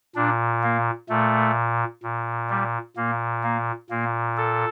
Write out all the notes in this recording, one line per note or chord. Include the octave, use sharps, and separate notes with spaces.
A#2 D4
A#3
A#2 A3
A#2
G3
A#2 A#3
A#3
A#2 A#3
A4